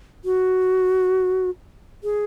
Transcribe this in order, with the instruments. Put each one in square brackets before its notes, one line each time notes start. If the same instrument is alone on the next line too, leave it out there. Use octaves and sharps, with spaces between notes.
[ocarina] F#4
G#4